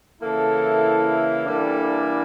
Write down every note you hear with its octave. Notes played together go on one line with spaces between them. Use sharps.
C#3 E3 A#3 E4 A4
E3 G3 A#3 D4 A4